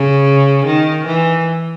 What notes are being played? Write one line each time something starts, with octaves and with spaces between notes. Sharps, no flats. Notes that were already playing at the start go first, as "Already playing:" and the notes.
Already playing: C#3
D#3
E3